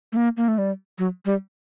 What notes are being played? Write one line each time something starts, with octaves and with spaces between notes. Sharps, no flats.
A3
A#3
A#3
A3
G3
F#3
G3